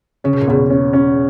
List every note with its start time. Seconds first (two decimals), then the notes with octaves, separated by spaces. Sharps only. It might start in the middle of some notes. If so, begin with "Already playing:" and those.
0.24 C#3 C#4
0.33 B2
0.41 A#2
0.47 E2 B2
0.70 C#4
0.93 C#4